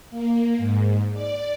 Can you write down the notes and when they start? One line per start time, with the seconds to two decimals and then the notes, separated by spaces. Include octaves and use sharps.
0.10 A#3
0.57 G#2
1.13 D5